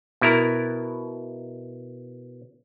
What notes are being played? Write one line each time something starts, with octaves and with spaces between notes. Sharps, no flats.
B2 E4 A#4